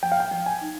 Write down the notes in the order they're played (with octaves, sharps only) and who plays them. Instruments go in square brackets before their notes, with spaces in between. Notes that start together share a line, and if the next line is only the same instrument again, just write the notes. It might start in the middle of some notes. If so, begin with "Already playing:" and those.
[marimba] F3 [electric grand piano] G5
[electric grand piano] F5
G5
[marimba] F3
[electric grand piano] G#5
[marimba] D#4